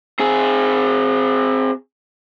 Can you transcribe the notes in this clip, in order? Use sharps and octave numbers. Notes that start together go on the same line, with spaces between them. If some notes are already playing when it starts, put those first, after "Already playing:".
C4 G#4